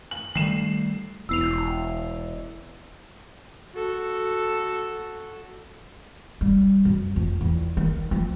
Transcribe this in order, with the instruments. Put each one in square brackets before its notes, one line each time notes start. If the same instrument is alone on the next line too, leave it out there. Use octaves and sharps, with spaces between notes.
[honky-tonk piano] F#7
[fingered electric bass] D#3 G3 A3 [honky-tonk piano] C7 E7
[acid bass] E1 [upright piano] E3 B3 [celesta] E6 C7 F7
[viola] F#4 A4
[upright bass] G3
F#2
F2
E2
D#3
F3